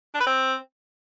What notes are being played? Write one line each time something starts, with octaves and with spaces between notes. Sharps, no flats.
D4
B4
C4